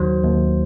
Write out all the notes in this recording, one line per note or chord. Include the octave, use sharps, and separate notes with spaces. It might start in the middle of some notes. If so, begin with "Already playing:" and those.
Already playing: D#2 D#3 F#3 C5
D#2